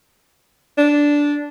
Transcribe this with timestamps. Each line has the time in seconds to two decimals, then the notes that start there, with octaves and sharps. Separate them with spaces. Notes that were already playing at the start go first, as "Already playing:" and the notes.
0.78 D4